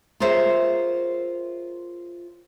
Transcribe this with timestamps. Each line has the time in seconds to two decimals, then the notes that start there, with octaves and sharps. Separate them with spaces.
0.20 F4 G#4 A#4 C5 C#5 E5